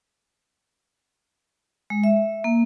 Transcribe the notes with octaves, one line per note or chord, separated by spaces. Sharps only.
G#3
E5
A#3